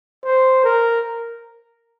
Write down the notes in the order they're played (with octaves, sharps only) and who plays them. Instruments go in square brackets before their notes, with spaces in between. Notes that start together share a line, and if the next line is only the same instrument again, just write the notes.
[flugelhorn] C5
A#4